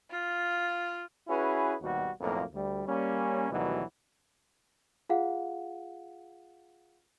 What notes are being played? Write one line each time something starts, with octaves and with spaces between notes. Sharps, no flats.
F4
C#4 E4 F#4 G#4 B4
G#1 D#2 B2 G3 F#4
B1 F2 A2 F3 A#3
D2 G3
G3 A#3 C#4
D2 B2 D#3 E3 F#3 G3
F4 G#4 F5 F#5